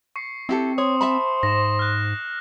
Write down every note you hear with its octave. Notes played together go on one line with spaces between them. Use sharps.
C#6 C7 C#7
C4 E4 G4 A4
C5 C#5 D#6
E5 A5 B5
G#2 A#6 E7
F6 F#6